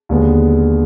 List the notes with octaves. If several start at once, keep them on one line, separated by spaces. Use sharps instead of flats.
D#2 D3 G#3 B3